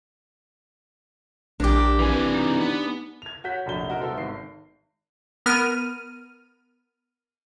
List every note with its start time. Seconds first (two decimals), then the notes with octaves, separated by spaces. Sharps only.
1.60 A#1 D4 G4 A#4 D6
1.99 E3 C4 B4 G#5
2.34 D#4
2.60 B3
3.22 G#6 F7
3.44 F#4 C#5 F#5 G6 B6
3.66 F1 A#1 F#4 G7
3.88 D#4 F#4 A#4
4.00 C2 B3 A4 C5
4.17 G#1 C7
5.46 B3 A#4 F6 D#7